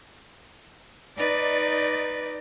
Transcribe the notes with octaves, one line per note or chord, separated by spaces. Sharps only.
D#4 B4 D5